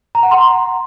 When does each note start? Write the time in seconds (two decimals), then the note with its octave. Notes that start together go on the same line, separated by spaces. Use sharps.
0.15 A#5
0.23 F#5
0.31 C6